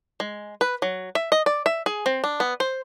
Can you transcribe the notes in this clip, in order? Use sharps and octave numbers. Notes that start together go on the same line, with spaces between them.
G#3
B4
F#3
E5
D#5
D5
E5
G#4
C4
D4
B3
C5